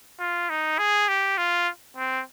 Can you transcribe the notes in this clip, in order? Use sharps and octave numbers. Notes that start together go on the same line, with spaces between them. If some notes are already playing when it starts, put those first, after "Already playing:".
F4
D#4
G#4
G4
F4
C4